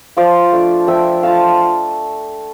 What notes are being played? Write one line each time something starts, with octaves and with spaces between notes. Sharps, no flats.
F3 D5 F5
A3 D4 F4
F3 E5 G5
A3 D4 F4 F5 A5